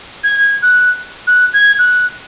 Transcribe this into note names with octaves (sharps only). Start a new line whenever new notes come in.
G#6
F#6
F#6
G#6
F#6